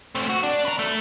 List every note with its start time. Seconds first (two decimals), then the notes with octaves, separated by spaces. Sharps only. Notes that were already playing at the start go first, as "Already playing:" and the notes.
0.15 A3 C4
0.30 F#4
0.43 D4
0.65 A#4 B4
0.79 A3